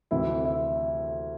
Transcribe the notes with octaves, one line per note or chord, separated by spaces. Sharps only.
D2 C3 E3 E4
E4